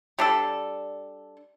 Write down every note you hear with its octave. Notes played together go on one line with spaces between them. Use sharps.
G3 D4 A4